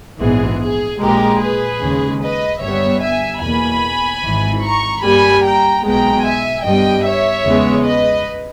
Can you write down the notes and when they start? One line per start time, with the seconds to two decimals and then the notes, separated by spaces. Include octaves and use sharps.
0.19 A#1 G#2 E3 G#3 B3 G#4
0.60 G#4
1.00 A#1 A#2 G#3 G4 A#4
1.40 G#4 B4
1.81 D#2 C#3 G#3
2.21 B4 D#5
2.62 G1 G2 G3 B3 C#5 E5
3.02 E5 G#5
3.42 E2 B2 A#3 G#5 B5
4.23 G#1 G#2 E3
4.63 A#5 C#6
5.03 G2 G3 A#3 G#5 B5
5.43 G5 A#5
5.83 B1 B2 G#3 B3 G5 A#5
6.24 E5 G#5
6.65 G2 G3 B3 D#5 G5
7.05 C#5 E5
7.45 E2 C#3 G#3 B3
7.85 B4 D#5